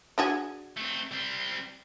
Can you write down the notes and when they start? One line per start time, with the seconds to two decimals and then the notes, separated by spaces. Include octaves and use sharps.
0.18 D4 F#4 G#4
0.77 A3 C4
1.12 G3 C4